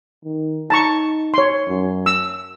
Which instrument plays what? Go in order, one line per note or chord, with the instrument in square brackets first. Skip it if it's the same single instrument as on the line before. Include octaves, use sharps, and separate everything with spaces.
[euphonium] D#3
[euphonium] D#4 [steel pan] A5 A#5 C#6
[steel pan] C#5 C6
[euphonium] F#2
[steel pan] E6